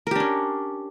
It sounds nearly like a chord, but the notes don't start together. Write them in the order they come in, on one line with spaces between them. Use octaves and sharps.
A#4 G4 D4 C#4